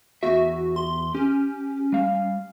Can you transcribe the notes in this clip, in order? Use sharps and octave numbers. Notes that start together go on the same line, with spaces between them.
E2 B3 F#4 E5
C6
C#4 G4
G3 F5